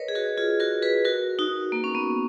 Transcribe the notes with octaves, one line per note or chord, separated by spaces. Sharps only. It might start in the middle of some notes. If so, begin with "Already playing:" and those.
Already playing: A#4 B4 C#5 D#5
G#4
F#4 A#4
F4 G#4
F#4 A#4
G#4 B4
F#4 A#4
D#4 F#4
A#3
C#4
B3